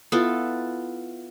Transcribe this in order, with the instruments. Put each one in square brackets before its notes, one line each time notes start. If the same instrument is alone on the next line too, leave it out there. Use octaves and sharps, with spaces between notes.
[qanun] B3 E4 F4 A4